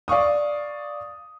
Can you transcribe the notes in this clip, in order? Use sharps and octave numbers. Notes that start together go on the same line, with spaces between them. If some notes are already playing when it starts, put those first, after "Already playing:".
D5 F5 C#6 D#6